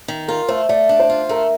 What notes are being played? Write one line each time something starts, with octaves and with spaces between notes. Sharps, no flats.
D#3
F4 A#4
A3 C5
A3 D5
D4
C5
F4
A3 A#4